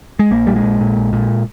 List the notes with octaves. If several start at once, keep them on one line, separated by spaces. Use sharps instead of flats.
G#3
A#1 A#3
A#2 G3
G#3
A#1
A#2
A#1
A#2